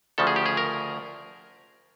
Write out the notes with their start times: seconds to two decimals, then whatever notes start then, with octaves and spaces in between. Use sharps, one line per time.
0.18 D2 C#3 F3 A4
0.27 G#4
0.36 G4
0.46 G#4
0.57 A#4